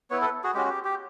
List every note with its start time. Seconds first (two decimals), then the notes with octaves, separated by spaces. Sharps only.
0.10 B3 E4 B4 C#5
0.21 A4 B4
0.44 F#4 G#4
0.54 G#3 C#4 F#4 G4
0.65 F#4
0.69 G4
0.84 G4